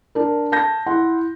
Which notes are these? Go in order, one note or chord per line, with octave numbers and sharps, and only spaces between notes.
D4 A#4
A5 G6 A#6
E4 F#5 C6